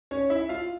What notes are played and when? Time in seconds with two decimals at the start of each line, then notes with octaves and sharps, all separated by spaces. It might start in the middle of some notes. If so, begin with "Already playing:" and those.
0.11 C#4 C#5
0.30 E4 E5
0.49 F4 F5